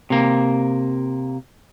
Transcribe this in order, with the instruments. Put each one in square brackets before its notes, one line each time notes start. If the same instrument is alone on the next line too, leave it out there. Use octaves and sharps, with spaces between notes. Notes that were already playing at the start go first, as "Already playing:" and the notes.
[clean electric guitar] C3 A#3